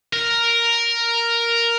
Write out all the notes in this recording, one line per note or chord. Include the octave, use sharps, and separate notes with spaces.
A#4